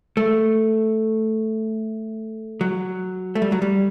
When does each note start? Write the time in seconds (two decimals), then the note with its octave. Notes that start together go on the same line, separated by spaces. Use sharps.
0.17 A3
2.61 F#3
3.35 A3
3.42 G3
3.52 F#3
3.62 G3